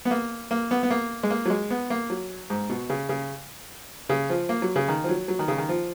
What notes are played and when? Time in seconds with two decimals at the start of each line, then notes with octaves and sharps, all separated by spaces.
0.05 B3
0.11 A#3
0.51 A#3
0.71 B3
0.83 B3
0.90 A#3
1.23 G#3
1.30 A#3
1.46 F#3
1.50 G#3
1.70 B3
1.90 A#3
2.10 F#3
2.50 G#2
2.70 B2
2.90 C#3
3.09 C#3
4.09 C#3
4.30 F3
4.49 A#3
4.62 F#3
4.76 C#3
4.88 D#3
5.04 F3
5.09 F#3
5.28 F#3
5.39 D#3
5.48 C#3
5.58 D#3
5.69 F3